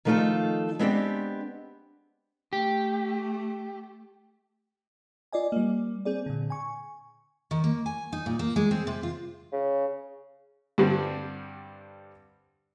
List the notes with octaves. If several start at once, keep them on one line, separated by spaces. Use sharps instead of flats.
D#3 F3 A3 D#4 F4 A4
G#3 B3 C4 D4 F#4 G4
A3 G4
F4 D5 D#5 G#5
G3 A#3
C4 G#4 D5
A#2 D3
G#5 C#6
D#3
A#3
G#5
D#4
A#2
A#3
G#3
C4
C3
F4
C#3
G2 D3 G3 C4 D4